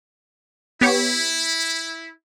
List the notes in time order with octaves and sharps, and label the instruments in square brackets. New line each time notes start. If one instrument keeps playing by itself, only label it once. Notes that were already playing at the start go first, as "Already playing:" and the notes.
[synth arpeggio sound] B3 G4 C#5 [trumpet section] E4